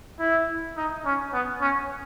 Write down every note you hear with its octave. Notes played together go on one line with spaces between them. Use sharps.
E4
D#4
C#4
B3
C#4